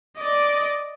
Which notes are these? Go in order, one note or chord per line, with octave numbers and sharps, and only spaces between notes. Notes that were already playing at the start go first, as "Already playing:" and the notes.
D5 D#5